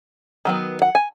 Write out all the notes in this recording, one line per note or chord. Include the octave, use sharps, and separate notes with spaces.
D#3 F#3 B3
F#5
G#5